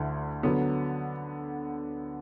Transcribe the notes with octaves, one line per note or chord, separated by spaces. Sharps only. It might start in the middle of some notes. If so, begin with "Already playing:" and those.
Already playing: D2 D3 E4
D3 F#3 B3